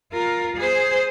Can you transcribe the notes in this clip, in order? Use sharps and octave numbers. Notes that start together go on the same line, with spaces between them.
F4 A#4
G#4 C5